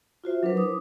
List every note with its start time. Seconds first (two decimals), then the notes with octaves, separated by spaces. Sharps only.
0.24 F4 F#4 C5 E5
0.43 F#3 D4 A#4 B4
0.57 D4 E4 C5 D6 D#6